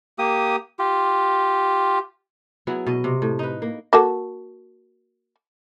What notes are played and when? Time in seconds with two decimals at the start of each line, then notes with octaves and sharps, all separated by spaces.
0.19 A#3 G4 D#6
0.79 F4 G4
2.67 F#3 B3 E4 G#4
2.87 B2 D#5
3.04 C3
3.22 A2
3.39 D#4 B4
3.62 A#3
3.93 A#3 F#4 A4